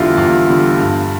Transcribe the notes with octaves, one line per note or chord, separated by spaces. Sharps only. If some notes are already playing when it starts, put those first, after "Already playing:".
Already playing: E2 D3 G3 E4 F4
E2 F4
D3 G3
G2